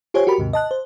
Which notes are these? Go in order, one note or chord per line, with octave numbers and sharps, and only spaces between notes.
F4 G4 C5 C#5 G#5
F#4 G4 A#4 B5
D#2 G#2 C3
D#5 A5 F#6
C5